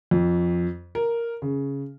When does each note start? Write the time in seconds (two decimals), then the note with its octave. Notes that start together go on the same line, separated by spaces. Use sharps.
0.11 F2
0.95 A#4
1.42 C#3